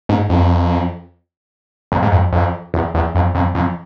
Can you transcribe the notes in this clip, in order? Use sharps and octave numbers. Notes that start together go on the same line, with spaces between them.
G#2
F2
F2
G#2
F2
F2
E2
E2
F2
F2
F2